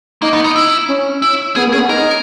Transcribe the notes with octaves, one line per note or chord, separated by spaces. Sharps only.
A#3 D#4
B3
D#4
E4
C#4
E4
B3 G#4
A#3
C#4 G#4
B3
D#4 A#4